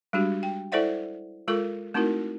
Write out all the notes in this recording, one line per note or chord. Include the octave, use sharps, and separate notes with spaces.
G3 G#3 D4 F#4 G4
G5
E4 A4 C5 D5 E5 F#5
G#3 F4 A4 A#4 C#6
A3 C4 D#4 E4 F#4 A#4